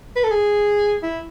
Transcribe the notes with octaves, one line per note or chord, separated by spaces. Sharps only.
B4
A4
G#4
E4